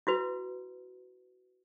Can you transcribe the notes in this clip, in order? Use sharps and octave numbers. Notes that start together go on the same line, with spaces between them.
E4 F#4 B4